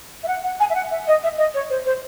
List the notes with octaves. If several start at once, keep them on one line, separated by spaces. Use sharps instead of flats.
E5
F#5
F#5
G#5
E5
F#5
E5
D#5
E5
D#5
C#5
C5
C5